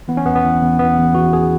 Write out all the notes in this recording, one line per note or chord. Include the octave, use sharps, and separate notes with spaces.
E3 B3
C#4
E2 B3
B3
E3
E2
E3 B3
E2
E2 F#4
E2 G#4